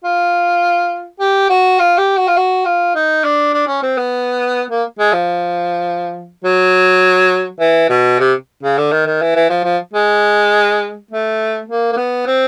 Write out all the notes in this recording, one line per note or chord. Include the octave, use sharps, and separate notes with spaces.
F4
G4
F#4
F4
G4
F#4
F4
F#4
F4
D#4
D4
D4
C#4
C4
B3
A#3
G#3
F3
F#3
E3
B2
C3
C#3
D3
D#3
D#3
E3
E3
F3
F3
G#3
A3
A#3
A#3
B3
C4